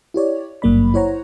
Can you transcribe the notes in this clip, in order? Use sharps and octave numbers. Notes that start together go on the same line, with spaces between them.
E4 G4 C#5 D5
G#1 G2 F#3 A#3 D5 B5
E4 C5 C#5 F#5 A#5